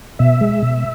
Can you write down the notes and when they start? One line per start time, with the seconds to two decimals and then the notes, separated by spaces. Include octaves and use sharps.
0.19 B2 E5
0.41 G#3
0.63 B2